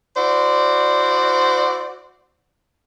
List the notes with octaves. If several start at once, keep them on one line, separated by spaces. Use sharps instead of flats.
E4 F#4 C5 D5